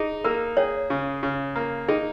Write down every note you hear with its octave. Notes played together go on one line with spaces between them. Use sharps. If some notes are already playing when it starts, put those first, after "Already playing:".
Already playing: D#4 G#4
A#3 A#4
G#4 C#5
C#3
C#3
A#3
D#4 G#4